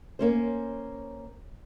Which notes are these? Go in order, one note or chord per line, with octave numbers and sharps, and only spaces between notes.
A#3 C#4 C5